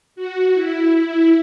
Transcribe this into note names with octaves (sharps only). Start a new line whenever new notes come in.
F#4
E4
E4